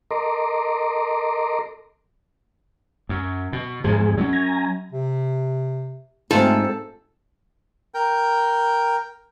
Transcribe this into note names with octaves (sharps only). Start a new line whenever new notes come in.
A4 A#4 D#5 A#5 C6 D6
F#2
B2
E2 G#2 F3 G#4
F#3 C4 C#4
G#5 A#5
C3
G#2 A3 C4 F4 A4
A#4 G5